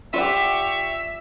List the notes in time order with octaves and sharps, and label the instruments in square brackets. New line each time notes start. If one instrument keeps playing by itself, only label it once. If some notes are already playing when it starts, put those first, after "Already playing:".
[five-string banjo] F4 D5 F#5 [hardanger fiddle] G4 C#6 [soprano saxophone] E5